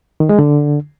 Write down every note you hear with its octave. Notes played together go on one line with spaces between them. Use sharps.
D#3
G#3
D3